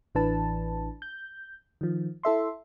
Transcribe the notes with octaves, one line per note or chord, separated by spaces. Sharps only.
A1 E3 D4 B4 A5
G6
D#3 F3
E4 A4 E5 C6